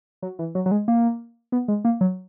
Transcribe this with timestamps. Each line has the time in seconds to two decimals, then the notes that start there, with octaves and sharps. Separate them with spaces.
0.22 F#3
0.39 E3
0.55 F#3
0.66 F#3
0.71 G#3
0.88 A#3
1.52 B3
1.68 G#3
1.85 A#3
2.01 F#3